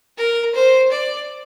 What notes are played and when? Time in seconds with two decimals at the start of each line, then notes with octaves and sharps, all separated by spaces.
0.18 A#4
0.55 C5
0.92 D5